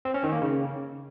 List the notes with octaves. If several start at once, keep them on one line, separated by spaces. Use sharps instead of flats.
C4
C#4
D#3
A#3
C#3